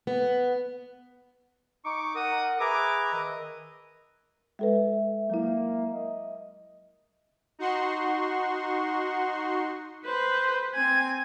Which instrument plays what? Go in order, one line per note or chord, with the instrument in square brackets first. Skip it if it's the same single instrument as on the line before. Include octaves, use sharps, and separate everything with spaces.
[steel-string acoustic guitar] B3
[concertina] D#4 [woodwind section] C#6 [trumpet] D6
[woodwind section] A#4 F#5 [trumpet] D#6
[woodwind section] G#4 G#5 A#5 [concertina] B4 E5 [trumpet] D6
[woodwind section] D#3 [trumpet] D#5
[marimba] G#3 A4 B4 [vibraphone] E5
[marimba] F#3 E4 [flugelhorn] A#3
[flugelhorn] D#5
[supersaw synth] D#4 F#4 F#5 C6 C#6
[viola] B4 C5
C4 G#5